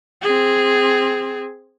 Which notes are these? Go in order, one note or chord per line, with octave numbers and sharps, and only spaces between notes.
C4 G#4